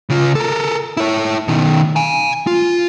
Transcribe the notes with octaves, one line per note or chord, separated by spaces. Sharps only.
C#3 F4
A4 A#4
E4 C#5
B2 D#3
F5 G#5
F4